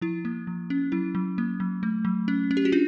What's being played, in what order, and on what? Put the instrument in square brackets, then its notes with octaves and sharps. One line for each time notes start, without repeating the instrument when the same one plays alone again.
[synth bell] F3 E4
A#3
F3
C#4
F#3 E4
F#3
A#3
F#3
A3
F#3
C#4
C#4
G4
F#4
D4 F4